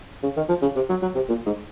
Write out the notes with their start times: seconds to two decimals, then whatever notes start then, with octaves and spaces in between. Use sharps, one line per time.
0.23 C#3
0.37 D#3
0.49 F3
0.62 C#3
0.76 C3
0.89 F#3
1.02 F#3
1.15 C3
1.29 A#2
1.46 G#2